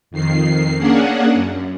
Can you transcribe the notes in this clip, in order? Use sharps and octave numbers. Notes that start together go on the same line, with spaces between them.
F2 D#3 C7
A#3 C#4 D4 G#4 F#5
F#2